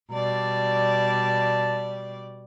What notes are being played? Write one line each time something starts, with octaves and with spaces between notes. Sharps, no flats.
B2 G3 D5 A5